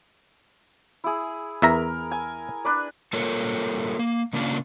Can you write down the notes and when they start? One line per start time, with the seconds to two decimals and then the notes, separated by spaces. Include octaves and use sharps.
1.04 E4 G#4
1.62 E2 A#4 E5 A#5
2.11 G#5
2.65 D4 B4 D5
3.13 G3 A#3 F4 A4 A#4 C#5
3.99 A#3
4.33 C#3 A#3 C#4 D4 F4